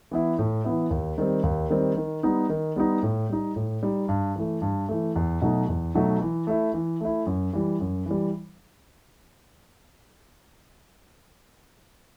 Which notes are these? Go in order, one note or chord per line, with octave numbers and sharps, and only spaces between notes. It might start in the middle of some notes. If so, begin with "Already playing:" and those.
E3 B3 E4
A2
E3 B3 E4
D#2
D#3 G3 C4
D#2
D#3 G3 C4
D#3
G3 B3 D#4
D#3
G3 B3 D#4
A2
G3 D#4
A2
G3 D#4
G2
E3 A3
G2
E3 A3
E2
B2 F#3 A3 D#4
E2
B2 F#3 A3 D#4
E3
A3 E4
E3
A3 E4
F#2
E3 G3
F#2
E3 G3